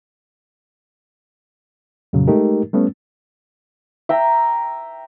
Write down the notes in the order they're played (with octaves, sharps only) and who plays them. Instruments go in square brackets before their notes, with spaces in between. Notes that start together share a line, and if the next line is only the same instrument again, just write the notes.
[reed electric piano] F2 A#2 C#3 F#3
G#3 A3 D#4 G4 A#4
G3 A3 B3 C#4
[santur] E5 G5 A#5